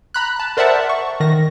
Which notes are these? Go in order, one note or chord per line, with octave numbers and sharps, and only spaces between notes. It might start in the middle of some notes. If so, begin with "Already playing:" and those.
A#5 B5 F#6
A5
A#4 C5 D5 E5 F#5 A5
C#6
D#3 A#6